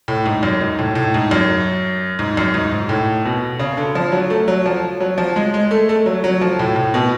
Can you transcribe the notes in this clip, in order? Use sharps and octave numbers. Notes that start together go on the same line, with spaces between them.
A2
G#2
F#2
G#2
A2
A2
G#2
F#2
G#2
F#2
G#2
G#2
A2
B2
C#3
D3
F3
F#3
A3
F#3
F3
F#3
F3
G#3
G#3
A3
A3
F#3
F#3
F3
A2
A2
B2